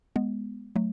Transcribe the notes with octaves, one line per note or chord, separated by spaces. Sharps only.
G#3 B3
F#3 A3